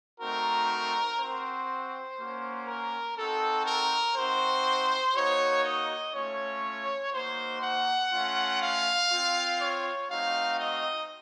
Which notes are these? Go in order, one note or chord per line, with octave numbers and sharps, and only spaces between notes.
A3 C4 D#4 F#4 A#4
C4 F#4 C5
A#3 C#4 F#4
A#4
C4 D#4 F#4 A4
A#4
C4 D#4 F#4 C5
A#3 D#4 F#4 C#5
D#5
A3 C#4 F4 C#5
A#3 D#4 F#4 C5
F#5
A3 C#4 F4
F5
C4 F4
C#5
A3 C4 D#4 F#4 F5
D#5